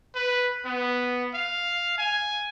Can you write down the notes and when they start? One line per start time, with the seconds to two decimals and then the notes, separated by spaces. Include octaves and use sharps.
0.15 B4
0.65 B3
1.34 F5
1.98 G#5